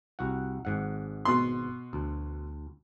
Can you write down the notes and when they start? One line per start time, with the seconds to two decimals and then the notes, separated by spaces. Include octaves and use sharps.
0.19 C2 F#4 F#5
0.65 G#1 G#2 F#5
1.25 B2 C6
1.93 D2